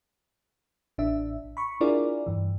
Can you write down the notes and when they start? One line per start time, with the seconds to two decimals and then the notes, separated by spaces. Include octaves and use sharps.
0.98 A1 D4 E5
1.57 B5 C#6
1.81 D4 E4 F4 G#4 A#4 D5
2.26 G2 E3